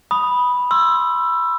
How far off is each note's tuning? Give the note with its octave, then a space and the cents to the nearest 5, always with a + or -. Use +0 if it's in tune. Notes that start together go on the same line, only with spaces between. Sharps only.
B5 -5 D#6 +0
C6 +10 E6 +20